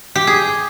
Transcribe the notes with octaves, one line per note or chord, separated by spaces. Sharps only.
G4
G#4